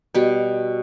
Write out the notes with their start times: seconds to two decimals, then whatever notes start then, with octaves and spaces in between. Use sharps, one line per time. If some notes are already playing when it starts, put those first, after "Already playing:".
0.14 B2 G3 G4